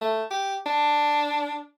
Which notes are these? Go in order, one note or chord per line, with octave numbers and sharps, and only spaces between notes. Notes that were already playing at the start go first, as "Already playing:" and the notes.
A3
G4
D4